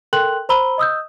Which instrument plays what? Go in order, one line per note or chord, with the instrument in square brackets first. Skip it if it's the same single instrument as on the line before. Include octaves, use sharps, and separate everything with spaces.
[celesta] A4 A#4 G5 C6 F#6 F#7
C5 A#5 B5 E6 G7
D#5 D#6 E6 G6